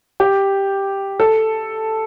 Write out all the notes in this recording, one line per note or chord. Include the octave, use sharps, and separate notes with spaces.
G4
A4